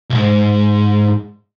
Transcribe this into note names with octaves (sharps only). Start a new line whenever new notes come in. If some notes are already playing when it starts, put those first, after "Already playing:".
C2 G#2